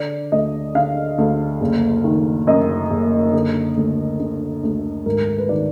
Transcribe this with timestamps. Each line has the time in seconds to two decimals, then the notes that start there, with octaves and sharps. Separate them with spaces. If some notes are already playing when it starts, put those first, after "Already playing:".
Already playing: D3 D5
0.32 D2 D#5
0.75 D3 F5
1.18 D2
1.61 F#1
2.04 D#3
2.47 F#2 D#5
2.91 F#1
3.33 D3
3.77 D2
4.20 D3
4.63 D2
5.06 G#1 A#4
5.38 B4
5.49 D#3 D5